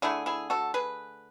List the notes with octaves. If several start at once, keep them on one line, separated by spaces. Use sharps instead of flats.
D3 A3 E4 G#4
E4 G#4
F#4 A4
G#4 B4